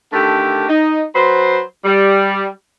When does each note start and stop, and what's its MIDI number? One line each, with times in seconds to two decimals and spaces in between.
0.13 0.69 50
0.13 0.69 51
0.13 0.69 57
0.13 0.69 67
0.13 0.69 70
0.69 1.03 63
1.15 1.61 54
1.15 1.61 71
1.15 1.61 72
1.85 2.47 55